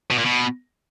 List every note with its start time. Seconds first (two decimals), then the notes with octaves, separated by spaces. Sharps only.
0.11 B2
0.18 A#2
0.25 B2